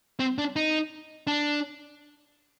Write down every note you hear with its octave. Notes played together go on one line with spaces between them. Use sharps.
C4
D4
D#4
D4